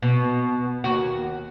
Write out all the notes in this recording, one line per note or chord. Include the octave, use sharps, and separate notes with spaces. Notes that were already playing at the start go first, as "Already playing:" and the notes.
B2
D#2 F#4